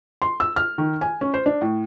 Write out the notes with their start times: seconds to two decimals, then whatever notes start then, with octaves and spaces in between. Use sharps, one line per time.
0.22 C6
0.40 E6
0.56 F6
0.78 D#3
1.01 G#5
1.21 C#4
1.34 C5
1.46 D4
1.62 A2